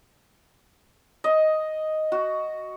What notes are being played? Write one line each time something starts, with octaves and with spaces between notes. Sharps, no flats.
D#5
F#4